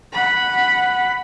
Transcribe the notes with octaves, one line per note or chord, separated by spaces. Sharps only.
F#5 B5